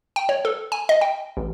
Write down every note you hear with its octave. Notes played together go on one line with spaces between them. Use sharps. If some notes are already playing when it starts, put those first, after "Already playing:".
G5
C#5
A4
G#5
D#5
G5
A1